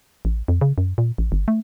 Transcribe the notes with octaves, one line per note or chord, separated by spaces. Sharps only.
A1
F2
C#3
F#2
A#2
A1
G1
A3